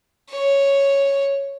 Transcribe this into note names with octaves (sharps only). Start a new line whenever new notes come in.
C#5